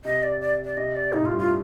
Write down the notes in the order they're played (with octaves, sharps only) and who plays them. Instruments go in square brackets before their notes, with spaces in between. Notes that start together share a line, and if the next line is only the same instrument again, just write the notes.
[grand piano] C3 [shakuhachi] D#5
[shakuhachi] D5
D5
D5
[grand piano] C3 [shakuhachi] D#5
[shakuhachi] D5
[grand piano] A2 [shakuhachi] D#4
[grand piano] A2 [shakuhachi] F4
[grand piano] G2
[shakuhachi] F4